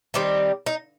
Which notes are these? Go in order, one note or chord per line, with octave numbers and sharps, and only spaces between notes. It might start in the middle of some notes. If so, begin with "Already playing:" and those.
D#3 G3 C4
D#4